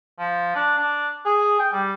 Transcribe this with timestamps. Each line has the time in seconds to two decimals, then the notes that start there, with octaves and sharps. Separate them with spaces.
0.19 F3
0.55 D4
0.78 D4
1.25 G#4
1.59 G5
1.73 G3